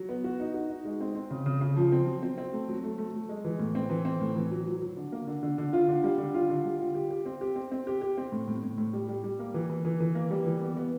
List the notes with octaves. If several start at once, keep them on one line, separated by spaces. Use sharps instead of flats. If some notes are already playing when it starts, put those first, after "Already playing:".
Already playing: F#3
B3
F#4
D#4
F#4
D#4
G#3
C4
C4
C#3
C#3
C#3
F3
C4
F#3
C4
C4
A3
F#3
A3
A3
F#3
G#3
E3
A2
C4
E3
C4
A2
E3
F#3
F#3
F#3
D3
A#3
D3
D3
D3
F4
D3
G3
D3
F4
D3
G3
F4
G4
G4
C4
G4
C4
C4
G4
G4
C4
A2
A2
A2
A2
G3
G3
G3
A#3
E3
E3
E3
E3
A#3
G3
E3
B3
B3